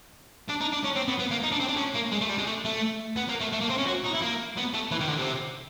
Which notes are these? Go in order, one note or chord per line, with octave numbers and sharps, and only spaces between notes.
D4
D#4
D4
C#4
C4
B3
B3
A#3
D#4
D4
C4
D4
C#4
A#3
G#3
A3
G3
G#3
A3
A3
B3
A#3
A3
A3
A#3
C4
C#4
F#4
D#4
E4
A#3
B3
A3
E3
D#3
D3
C3